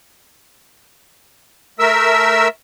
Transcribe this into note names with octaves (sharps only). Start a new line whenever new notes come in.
A3 A#4 E5 E6